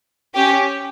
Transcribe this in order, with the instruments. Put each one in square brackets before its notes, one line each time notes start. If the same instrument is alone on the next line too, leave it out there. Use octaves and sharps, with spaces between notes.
[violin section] C#4 G4